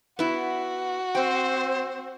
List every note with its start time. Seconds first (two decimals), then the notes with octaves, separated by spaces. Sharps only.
0.19 B3 E4 F#4
1.15 C4 C5 G5